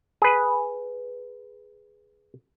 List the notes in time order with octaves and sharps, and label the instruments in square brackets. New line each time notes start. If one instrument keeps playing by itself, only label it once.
[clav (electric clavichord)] G#4 B4